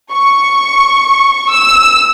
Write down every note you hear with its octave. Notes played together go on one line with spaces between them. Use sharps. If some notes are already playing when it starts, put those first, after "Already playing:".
C#6
E6